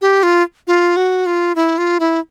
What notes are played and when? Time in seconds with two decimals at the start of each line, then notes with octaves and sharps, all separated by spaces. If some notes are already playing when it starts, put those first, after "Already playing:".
0.02 G4
0.23 F4
0.67 F4
0.97 F#4
1.26 F4
1.56 E4
1.78 F4
2.00 E4